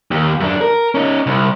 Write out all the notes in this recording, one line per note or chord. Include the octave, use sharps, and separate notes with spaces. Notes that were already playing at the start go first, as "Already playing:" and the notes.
D#2
F#2 D4
A#4
C#4 D#4
C2